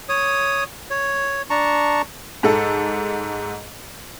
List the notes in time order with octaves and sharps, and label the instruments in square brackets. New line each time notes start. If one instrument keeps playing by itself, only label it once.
[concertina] C#5 D#6
C#5
D4 A5 A#5 C#6
[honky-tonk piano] G#2 A4